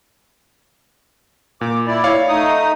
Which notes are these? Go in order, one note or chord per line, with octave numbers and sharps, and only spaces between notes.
A#2 D6
E4 D5
C#5 F5
A3 D#4 D#6